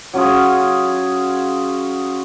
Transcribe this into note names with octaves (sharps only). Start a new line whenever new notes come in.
F#3 C#4 F4 G#4